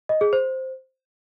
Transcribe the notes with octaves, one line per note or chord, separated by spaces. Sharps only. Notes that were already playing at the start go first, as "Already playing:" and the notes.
D#5
G#4
C5